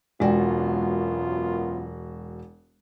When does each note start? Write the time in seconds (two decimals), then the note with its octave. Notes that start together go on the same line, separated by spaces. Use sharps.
0.20 E1 F#2 G#3 B3 F4 F#4 D5 G5